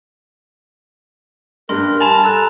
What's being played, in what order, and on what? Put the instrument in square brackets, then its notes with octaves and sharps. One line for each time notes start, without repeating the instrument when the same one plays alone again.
[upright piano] G2 [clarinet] A#4 [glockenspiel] C6
[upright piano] G#5 F7 [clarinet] A5 [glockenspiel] B5 E7
[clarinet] A4 [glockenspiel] A#5 F#6 E7